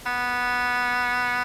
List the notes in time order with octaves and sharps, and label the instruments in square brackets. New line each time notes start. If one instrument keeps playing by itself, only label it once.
[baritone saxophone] B3